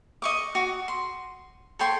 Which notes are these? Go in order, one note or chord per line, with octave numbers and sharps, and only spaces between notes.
D#5 C#6 D6
F#4
C6
A4 C#5 G5 C6